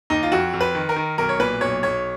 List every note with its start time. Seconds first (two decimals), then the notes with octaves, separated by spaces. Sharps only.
0.10 D#2 D#4
0.23 F4
0.32 F2 F#4
0.54 F2
0.61 B4
0.75 D#3
0.89 A#4
0.96 D#3
1.18 B1 A#4
1.29 C#5
1.39 A#2 B4
1.61 B1 C#5
1.83 B1 C#5